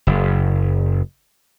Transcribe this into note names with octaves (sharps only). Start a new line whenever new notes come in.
F#1